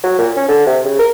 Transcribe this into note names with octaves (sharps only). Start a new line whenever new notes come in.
F#3
A#2
C#4
D3
C3
C#3
A#4